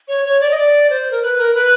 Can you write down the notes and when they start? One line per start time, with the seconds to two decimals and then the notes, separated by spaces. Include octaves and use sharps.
0.08 C#5
0.26 C#5
0.40 D5
0.51 D#5
0.57 D5
0.90 C5
1.11 A#4
1.22 B4
1.38 A#4
1.54 B4